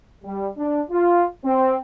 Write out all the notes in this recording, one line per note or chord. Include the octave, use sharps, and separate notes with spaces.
G3
D4
F4
C4